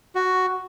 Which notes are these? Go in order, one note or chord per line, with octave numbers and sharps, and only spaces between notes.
F#4